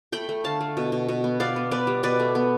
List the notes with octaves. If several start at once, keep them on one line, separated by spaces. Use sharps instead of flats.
A3 G5 B5
A3
D3 F5 A5
A3
B2
B2
B2
B3
B3 D5 F5
B3
B3 B4 D5
G3
B2 B4 D5
A3
B3